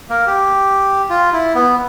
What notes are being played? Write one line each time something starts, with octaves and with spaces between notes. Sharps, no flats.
A#3 A#4
G4
F4
E4
B3